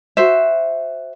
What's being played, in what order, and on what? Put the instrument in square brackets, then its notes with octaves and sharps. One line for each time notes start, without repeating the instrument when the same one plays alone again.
[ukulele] F#4 C5 E5